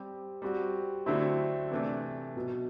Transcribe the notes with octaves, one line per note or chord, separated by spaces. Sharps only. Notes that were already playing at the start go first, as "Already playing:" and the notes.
Already playing: G3 C4 G4
G3 C4 F#4
D3 F#3 A3 C4 E4
C3 E3 A3 D4
B2 F#3 B3